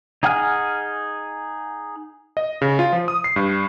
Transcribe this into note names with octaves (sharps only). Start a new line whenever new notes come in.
D#4 G#4 F#5 G#5 F6
D#5
C#3
F4
F3
D#6
C7
G2